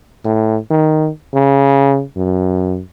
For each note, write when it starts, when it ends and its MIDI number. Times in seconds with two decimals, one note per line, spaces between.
0.25 0.57 45
0.71 1.09 51
1.34 2.03 49
2.17 2.81 42